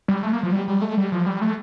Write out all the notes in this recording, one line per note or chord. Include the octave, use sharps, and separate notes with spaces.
G3
A3
A#3
F3
G3
G3
A3
G3
F3
G3
A3